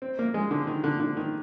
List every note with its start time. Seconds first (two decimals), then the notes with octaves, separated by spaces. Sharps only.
0.02 C4
0.19 A#3
0.34 G#3
0.51 D3
0.67 D#3
0.84 D3
1.00 D3
1.17 D#3